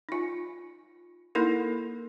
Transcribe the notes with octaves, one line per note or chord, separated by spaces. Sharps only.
D#4 F4
A#3 D#4 E4 A4 A#4